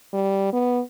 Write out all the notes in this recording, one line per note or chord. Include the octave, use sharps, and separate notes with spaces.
G3
B3